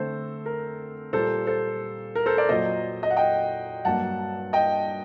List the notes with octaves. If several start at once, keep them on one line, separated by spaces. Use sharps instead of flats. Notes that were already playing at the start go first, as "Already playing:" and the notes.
Already playing: D3 A3 C4 A4 C5
A#4
A#2 G3 A#3 A4 C5
A4 C5
A#4
A4 C5
A#4 D5
A#2 F#3 A#3 C5 D#5
D#5
F#5
D#5 G5
G2 F#3 A#3 F#5 A5
D#5 G5